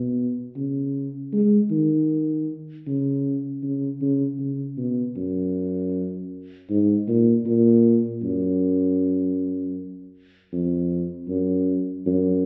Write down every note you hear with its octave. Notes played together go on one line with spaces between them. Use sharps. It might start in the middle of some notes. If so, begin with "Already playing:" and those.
Already playing: B2
C#3
G#3
D#3
C#3
C#3
C#3
C#3
B2
F#2
G#2
A#2
A#2
F#2
F2
F#2
F#2